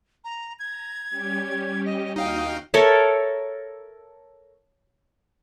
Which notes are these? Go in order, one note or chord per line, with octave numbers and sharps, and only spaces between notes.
A#5
A#5 G#6
G3 C#4 G4
D#5
D#2 D#4 F#4 F5 G5 D#6
A4 A#4 C#5 E5